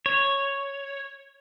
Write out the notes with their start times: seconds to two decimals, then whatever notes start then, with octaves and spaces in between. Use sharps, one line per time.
0.06 C#5